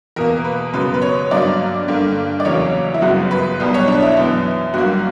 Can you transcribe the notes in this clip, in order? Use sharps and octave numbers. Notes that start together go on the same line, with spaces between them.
E2 B2 A#3 A#4
B4
F#2 C#3 F#3 B3 B4
B4
C#5
G2 F#3 A#3 D5
G2 D3 A#3
D5
E2 C#3 F#3 A#3 C#5
E4
G1 F#2 C#3 F#3 B3 F#4
B4
B1 B2 G3 B3
C#5
D4
E4
F#2 E3 B3
G1 G2 F#3 A#3 F#4